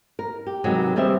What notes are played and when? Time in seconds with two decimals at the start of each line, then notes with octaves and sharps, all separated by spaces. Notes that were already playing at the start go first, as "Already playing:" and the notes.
0.19 A#4
0.46 G4
0.64 C3 D#3 F#3 G#3 B3
0.96 G3 B3 C4 G4 C5 E5